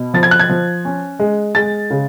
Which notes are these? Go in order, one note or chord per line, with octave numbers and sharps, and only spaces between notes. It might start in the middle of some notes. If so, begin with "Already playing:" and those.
Already playing: B2
F3 A6
G#6
F#6
G#6
F3
C#4
G#3
G#3 A6
C#3